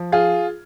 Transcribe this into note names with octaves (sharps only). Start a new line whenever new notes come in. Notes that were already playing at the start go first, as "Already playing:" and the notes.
Already playing: F3
F4 G#4